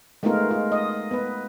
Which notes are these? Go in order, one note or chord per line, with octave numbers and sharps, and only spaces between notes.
G#3 A3 B3 D#4 F4 A#4
F4
D#5
B3 B4